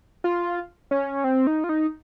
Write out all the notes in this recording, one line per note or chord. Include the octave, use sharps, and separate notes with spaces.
F4
C#4
C4
D#4
F4
D#4